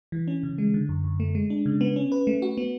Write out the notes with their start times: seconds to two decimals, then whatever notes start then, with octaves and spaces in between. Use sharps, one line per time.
0.12 E3
0.28 C#4
0.43 C#3
0.58 G#3
0.74 D3
0.89 F#2
1.04 F#2
1.20 A3
1.35 G#3
1.50 D4
1.66 C#3
1.81 B3
1.96 C#4
2.12 B4
2.27 A3
2.42 F#4
2.57 B3